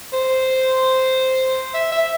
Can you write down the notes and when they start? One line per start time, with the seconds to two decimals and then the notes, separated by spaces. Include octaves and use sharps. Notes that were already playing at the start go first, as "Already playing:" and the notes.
0.13 C5
1.74 E5
1.92 E5